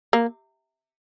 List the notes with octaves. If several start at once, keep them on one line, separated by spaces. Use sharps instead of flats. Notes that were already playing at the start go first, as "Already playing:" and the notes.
A#3